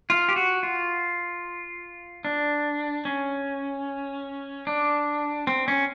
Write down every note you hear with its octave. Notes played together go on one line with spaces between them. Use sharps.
F4
G4
F#4
F4
D4
C#4
D4
C4
C#4